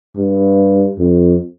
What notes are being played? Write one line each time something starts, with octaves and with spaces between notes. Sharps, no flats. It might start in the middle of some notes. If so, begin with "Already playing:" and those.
G2
F2